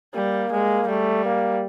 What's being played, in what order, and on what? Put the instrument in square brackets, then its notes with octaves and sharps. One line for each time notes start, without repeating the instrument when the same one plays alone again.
[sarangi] G3 [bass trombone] A#3
[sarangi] G#3
[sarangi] G3 [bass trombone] A3
[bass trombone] A#3